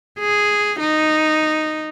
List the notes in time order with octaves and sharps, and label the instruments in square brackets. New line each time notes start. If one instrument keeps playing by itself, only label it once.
[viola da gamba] G#4
D#4